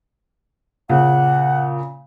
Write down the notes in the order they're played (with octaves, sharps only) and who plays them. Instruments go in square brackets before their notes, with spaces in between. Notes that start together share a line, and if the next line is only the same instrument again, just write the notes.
[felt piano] A#2 C#3 [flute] F#5